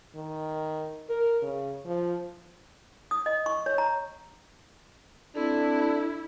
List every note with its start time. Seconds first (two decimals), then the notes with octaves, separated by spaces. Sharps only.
0.15 D#3
1.09 A#4
1.42 C#3
1.85 F3
3.11 D#6
3.26 D#5
3.46 C#6
3.66 C#5
3.78 A#5
5.36 C4 D4 E4 A4